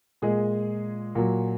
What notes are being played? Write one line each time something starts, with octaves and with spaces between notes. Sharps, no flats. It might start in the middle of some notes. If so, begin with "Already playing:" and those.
A#2 G#3 G#4
A#2 F#3